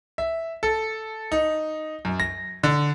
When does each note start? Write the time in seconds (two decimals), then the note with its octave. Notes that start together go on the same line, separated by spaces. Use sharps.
0.18 E5
0.63 A4
1.32 D#4
2.05 F#2
2.20 A#6
2.63 D3